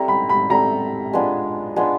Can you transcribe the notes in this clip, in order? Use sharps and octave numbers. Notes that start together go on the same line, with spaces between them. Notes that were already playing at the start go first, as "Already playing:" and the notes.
Already playing: G3 C4 E4 A4 A#5
B5
B5
G3 C4 E4 A4 A#5
G#3 B3 D4 F4
G#3 B3 D4 F4